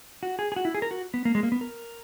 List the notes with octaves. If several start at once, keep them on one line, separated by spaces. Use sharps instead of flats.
F#4
G#4
G#4
F#4
E4
G#4
A#4
F#4
B3
A#3
G#3
A#3
B3
A#4